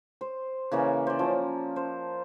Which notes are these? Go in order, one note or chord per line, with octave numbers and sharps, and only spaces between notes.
C5
C#3 E3 A#3 C#4
C5 D5
F3 C#4
C5